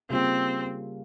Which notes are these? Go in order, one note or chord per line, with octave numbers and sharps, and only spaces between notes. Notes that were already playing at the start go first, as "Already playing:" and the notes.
C#3 G3 A#3 C4 F4